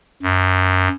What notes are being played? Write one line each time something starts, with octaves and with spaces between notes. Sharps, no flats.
F#2